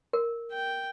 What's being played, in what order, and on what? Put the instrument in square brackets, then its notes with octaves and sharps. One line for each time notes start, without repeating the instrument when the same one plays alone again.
[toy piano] A#4
[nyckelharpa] G5